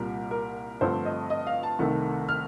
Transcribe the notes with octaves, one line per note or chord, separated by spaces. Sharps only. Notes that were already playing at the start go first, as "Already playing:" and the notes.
Already playing: C2 A#2 G3 A#4
A#4
G2 D3 F3 A3 C4 C5
D#5
D#5
F5
A5
C2 C3 D#3 A3
F6